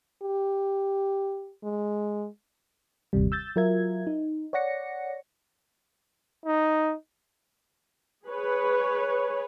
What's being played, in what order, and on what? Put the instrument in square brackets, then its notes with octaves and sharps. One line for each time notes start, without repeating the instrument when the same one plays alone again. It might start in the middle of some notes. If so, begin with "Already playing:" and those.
[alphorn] G4
G#3
[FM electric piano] G1 D#2 C3 G3
E6 G6 A6
F#3 F4 A#4 E5 G#6
D#4
C#5 D5 F#5 A#6 C#7
[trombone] D#4
[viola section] G#4 B4 C#5